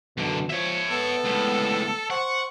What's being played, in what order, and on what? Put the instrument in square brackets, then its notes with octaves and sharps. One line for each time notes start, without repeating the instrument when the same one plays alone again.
[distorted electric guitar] F#2 D3 [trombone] B2
[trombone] F3 [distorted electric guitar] C#5 E5
[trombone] B3 [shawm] A4
[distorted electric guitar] C#2 A2
[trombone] C5 [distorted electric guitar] F#5 [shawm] C#6